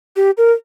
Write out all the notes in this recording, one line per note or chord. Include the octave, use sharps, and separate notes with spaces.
G4
A#4